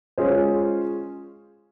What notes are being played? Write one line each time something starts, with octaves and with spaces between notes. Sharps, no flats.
G#3 C#4 F4 G#4 C5